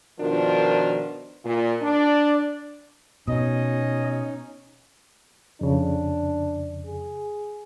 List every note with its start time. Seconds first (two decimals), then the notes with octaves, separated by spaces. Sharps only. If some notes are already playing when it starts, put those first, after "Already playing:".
0.19 B2 D#3 F3 D4 F4 A#4
1.44 A#2
1.82 D4 D5
3.28 B2 C#4 D#4 D#5
5.61 F2 C#3 D4
6.86 G#4